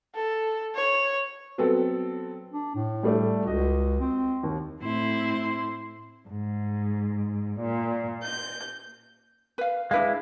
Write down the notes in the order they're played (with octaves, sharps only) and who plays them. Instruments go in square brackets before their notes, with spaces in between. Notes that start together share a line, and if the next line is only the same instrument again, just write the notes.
[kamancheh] A4
C#5
[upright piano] F#3 B3 C4 A4
[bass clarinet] D4
A2
[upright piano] G3 A3 D4
[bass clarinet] C#2 [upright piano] F#4 D#5
[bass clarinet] C4
[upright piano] D#2
[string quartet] A2 C4 E4 C6
G#2
A#2
G6
[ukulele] B4 F5
[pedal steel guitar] G#3 E4 [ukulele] D4 B4 F5